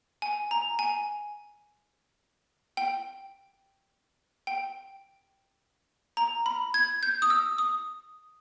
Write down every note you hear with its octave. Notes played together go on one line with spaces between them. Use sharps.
G#5
A#5
G#5
G5
G5
A#5
B5
G#6
G6
D#6
E6
D#6